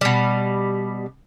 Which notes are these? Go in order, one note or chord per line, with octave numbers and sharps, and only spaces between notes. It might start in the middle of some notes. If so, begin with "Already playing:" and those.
B2 G3